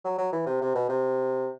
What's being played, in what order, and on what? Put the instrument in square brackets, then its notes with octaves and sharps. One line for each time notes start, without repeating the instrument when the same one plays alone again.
[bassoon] F#3
F#3
E3
C3
C3
B2
C3